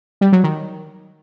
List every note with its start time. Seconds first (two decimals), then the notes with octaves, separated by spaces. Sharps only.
0.21 G3
0.32 F#3
0.44 D#3